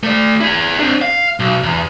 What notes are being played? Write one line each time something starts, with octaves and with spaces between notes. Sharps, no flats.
A3 D5
E4 G#4
C4 D4
F5
B1
E2